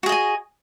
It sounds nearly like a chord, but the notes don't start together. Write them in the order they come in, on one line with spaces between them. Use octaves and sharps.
F#4 G#4 D#5 G#5